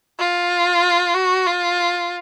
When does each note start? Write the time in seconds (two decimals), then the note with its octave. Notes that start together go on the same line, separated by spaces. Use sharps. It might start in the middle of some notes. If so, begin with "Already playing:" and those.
0.19 F4
1.14 F#4
1.46 F4